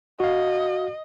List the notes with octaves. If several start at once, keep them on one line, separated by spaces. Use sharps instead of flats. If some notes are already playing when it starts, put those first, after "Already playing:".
F#4 D#5 F5